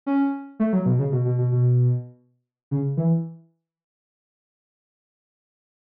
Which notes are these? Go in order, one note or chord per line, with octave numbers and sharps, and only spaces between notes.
C#4
A3
F#3
B2
C#3
B2
B2
B2
B2
C#3
E3